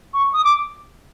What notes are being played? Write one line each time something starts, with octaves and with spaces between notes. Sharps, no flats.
C#6
D#6
D6